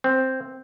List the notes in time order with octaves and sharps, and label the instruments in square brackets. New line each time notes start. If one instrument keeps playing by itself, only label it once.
[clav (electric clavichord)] C4